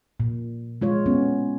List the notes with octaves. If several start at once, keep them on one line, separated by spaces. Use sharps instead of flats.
A#2
G#3 F4 C#5
B3 C#4